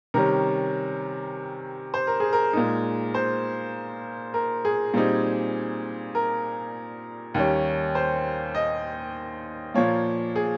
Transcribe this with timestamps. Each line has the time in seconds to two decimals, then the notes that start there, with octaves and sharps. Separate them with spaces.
0.14 C3 D#3 G3 C#4 A#4
1.94 C5
2.07 A#4
2.20 G#4
2.33 A#4
2.53 A#2 G#3 D#4
3.14 C5
4.34 A#4
4.65 G#4
4.94 A#2 G3 C4 D#4
6.15 A#4
7.34 D#2 D#3 G3 C#4
7.95 C5
8.55 D#5
9.74 A#2 F3 A#3 C#5
10.36 G#4